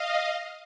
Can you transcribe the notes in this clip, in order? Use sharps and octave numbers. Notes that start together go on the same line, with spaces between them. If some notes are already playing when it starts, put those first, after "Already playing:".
Already playing: D#5 F5